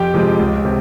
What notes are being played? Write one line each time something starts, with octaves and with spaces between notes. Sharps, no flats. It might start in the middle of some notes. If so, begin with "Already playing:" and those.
Already playing: F2 G4 G5
C3 F3 G#3
C#2
C3